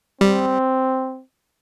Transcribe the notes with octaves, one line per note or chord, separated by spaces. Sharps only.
G3 C4